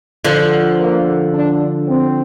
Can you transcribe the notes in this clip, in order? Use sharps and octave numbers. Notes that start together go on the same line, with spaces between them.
D3 F3
A#3
D4
C4